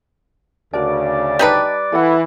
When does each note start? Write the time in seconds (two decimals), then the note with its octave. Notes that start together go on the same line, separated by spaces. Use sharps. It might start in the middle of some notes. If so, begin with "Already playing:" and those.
0.73 D2 C#3 F#4 A#4 D5 A5
1.39 G3 D#4 B4 D#5 G5 A5
1.92 E3 A4 F#5